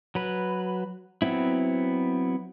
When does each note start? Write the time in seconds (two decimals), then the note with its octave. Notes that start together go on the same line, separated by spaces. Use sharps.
0.15 F#3 B4
1.22 F#3 B3 C4 E4